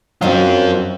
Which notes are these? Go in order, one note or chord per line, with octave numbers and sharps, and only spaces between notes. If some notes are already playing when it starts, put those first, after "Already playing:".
F#2 D#3 F#3 C4 F4 C5 D#5